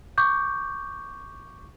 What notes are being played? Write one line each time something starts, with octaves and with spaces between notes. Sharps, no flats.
C#6 D6 G6